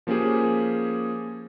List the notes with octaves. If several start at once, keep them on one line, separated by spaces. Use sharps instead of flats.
F3 A#3 C#4 G4 G#4